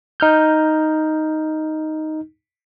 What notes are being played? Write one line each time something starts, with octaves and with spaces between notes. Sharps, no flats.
D#4 F6 G6